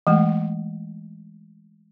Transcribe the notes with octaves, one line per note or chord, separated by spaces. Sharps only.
E3 G#3 A3